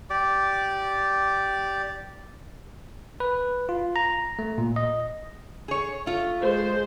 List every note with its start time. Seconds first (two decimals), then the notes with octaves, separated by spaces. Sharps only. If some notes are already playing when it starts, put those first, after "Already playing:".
0.10 G4 D5 D6
3.20 B4
3.69 F4
3.96 A#5
4.39 A3
4.58 A#2
4.76 D#5
5.68 G#4 C#5
6.06 A3 F4
6.41 G#3 C5